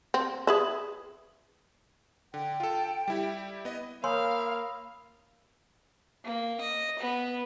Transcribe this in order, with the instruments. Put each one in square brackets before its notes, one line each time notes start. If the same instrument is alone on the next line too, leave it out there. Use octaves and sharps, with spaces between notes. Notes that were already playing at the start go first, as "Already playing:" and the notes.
[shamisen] C4
G#4 B4 E5
[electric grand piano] D3 [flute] G5
[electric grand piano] F4 A4
G3 E4 G4
B3 D#5
[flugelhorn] A#3 [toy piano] C#5 G#5 C6 [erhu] F5 [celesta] B5 D#6 E6
[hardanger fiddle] A#3
D#5
B3